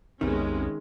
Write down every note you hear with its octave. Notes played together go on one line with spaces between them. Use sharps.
B1 F2 C3 D#3 G#3 B3 C#4